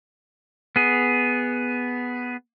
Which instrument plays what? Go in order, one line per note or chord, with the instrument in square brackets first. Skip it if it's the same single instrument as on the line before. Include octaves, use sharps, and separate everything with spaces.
[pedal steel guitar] B3 G#4